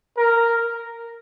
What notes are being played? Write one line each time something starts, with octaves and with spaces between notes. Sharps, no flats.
A#4